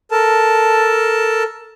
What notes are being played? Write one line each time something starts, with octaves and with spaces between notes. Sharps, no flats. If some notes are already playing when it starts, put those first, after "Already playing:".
A4 A#4 A5